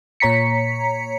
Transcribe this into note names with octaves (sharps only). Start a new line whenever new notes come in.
A#2 C#5 A#5 B6 C#7